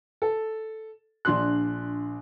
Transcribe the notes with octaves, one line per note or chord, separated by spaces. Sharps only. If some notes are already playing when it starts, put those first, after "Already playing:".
A4
A#1 D4 C6 F#6